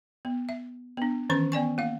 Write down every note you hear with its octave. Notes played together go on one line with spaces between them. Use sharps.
B3
E5
B3 D4
D#3 E3 C#4 C5 C#6
B3 D5 G#5 C#6
A#3 F5